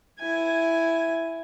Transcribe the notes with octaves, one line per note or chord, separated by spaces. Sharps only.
E4 G#5